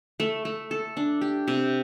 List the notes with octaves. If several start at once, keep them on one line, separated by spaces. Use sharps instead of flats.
A3
A3
A4
D4
G4
C3